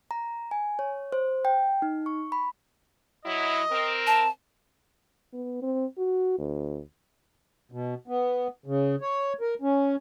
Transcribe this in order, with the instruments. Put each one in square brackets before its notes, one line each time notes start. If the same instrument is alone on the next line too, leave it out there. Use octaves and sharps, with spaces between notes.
[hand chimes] A#5
G#5
C#5
C5
G5
D#4
C#6
B5
[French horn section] F#3 E4 [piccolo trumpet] D#5
[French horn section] C4 A#4
[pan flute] A5
[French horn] B3
C4
F#4
D2
[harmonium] B2
B3
C#3
C#5
A#4
C#4